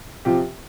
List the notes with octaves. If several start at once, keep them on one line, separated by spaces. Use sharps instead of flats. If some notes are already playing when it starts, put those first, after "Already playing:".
C3 F3 F4 G4